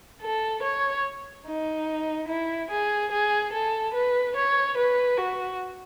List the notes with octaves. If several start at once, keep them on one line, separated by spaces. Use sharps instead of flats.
A4
C#5
D#4
E4
G#4
G#4
A4
B4
C#5
B4
F#4